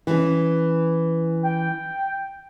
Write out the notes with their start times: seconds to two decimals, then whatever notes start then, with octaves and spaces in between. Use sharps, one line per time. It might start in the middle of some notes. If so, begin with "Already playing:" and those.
0.07 E3 C#4
1.43 G5